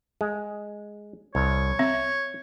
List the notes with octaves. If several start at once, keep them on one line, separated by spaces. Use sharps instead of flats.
G#3
C2 C#5
C4 E5